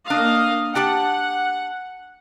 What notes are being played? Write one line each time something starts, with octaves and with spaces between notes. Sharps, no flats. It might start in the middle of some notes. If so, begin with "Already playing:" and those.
A#3 D4 D#5 F5
D4 G4 F#5 A5